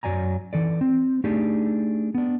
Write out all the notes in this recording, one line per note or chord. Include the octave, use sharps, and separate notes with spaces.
F#2 F#3 D5 G#5 A#5
E3 A4 D5
C4
A3 D4 D#4 G4 G#4
B3 D4